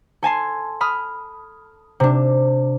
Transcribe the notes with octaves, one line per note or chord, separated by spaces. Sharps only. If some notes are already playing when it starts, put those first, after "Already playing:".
A4 G#5 A5 C6
B5 D#6 F6
C3 D4